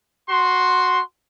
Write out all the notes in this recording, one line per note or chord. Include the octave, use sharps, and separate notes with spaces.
F#4 C6